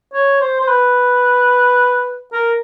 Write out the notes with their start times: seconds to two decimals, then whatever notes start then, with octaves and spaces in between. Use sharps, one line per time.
0.14 C#5
0.41 C5
0.60 C5
0.68 B4
2.33 A#4